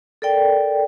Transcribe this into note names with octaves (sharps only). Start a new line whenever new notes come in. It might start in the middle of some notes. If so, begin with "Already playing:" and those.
A4 A#4 D5 G5